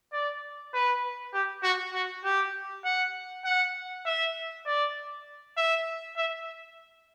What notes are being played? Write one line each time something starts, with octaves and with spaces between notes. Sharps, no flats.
D5
B4
G4
F#4
F#4
G4
F#5
F#5
E5
D5
E5
E5